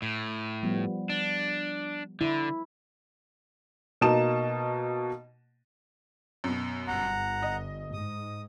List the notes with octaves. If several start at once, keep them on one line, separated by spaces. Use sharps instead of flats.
A2
F3 G3 B3
D4
D3 E4
B2 A#3 D#4 D#5 A5 E7
F#2 B2
G1 F#5 A#5
D#5
G#2 D#6